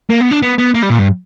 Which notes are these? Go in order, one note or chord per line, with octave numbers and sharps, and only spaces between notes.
A#3
B3
D4
B3
B3
A#3
G3
A#2
G2